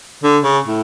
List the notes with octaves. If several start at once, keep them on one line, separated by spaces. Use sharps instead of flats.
D3
C#3
A2